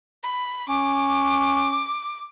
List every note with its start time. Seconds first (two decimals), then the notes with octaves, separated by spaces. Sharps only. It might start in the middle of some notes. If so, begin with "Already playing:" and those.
0.23 B5
0.69 C#4 D6